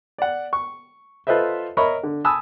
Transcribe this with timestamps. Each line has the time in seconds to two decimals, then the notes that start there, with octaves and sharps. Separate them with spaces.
0.18 D5 F#5
0.53 C#6
1.27 F4 A4 B4 C5 D#5 E5
1.77 A#4 C#5 D#5 E5 B5 C#6
2.03 D3
2.24 G#5 A5 B5 D#6 E6